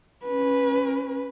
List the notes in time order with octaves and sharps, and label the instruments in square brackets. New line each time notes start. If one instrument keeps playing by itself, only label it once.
[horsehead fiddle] C#4 B4